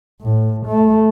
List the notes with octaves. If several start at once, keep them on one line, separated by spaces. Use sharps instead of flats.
A2
A3